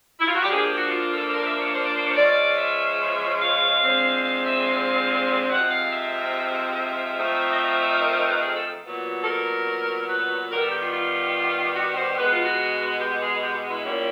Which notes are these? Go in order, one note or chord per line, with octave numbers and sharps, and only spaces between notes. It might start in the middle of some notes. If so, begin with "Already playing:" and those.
E4
F4
F#4
G4
F3 A#3 D4 G#4
G4
F#4
F4
A4
A#4
E5
C#5
C5
D5
C5
C#5
F3 G#3 C#4 D5
E5
F5
D3 F3 G#3 C4
F5
E5
F5
C3 F3 G#3 C4 F#5
F5
E5
E5
F3 A3 C4 D#4
D#5
E5
E5
A#4
A#4
B4
G#4
A4
A#2 F#3 B3
A4
A#4
B4
D#3 G3 B3 A#4
A4
G4
F4
F4
F#4
C5
B2 G#3 B3 B4
F4
F#4
G4
G#4
G4
E4
A#2 G3 A#3 C#4